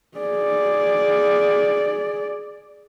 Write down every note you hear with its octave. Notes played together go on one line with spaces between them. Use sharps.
G#4 D5